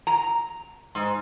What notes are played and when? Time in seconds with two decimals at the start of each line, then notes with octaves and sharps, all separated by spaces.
0.07 A#5
0.95 G#2